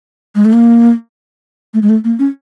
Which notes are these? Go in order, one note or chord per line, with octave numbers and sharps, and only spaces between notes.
G#3
A3
A#3
A3
G#3
A3
A#3
C#4